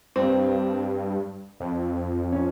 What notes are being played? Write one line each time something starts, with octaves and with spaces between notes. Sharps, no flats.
G2 C4
F2
C#4